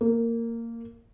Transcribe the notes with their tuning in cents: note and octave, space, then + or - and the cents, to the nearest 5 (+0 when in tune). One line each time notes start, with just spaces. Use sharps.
A#3 -15